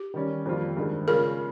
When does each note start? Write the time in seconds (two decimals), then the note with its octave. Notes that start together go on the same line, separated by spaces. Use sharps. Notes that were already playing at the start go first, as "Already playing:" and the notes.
Already playing: G4
0.14 D#3 G3 C#4
0.46 F2 D#3 G3 A#3 F4
0.77 G2 D#3 G#3
1.07 C#3 G#3 C#4 F4 A#4